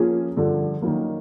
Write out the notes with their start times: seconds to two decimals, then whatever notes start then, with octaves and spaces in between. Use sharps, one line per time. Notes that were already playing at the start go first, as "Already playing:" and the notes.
Already playing: F3 A#3 C#4 F4 G#4
0.36 G2 D3 F3
0.82 D#3 F#3 A#3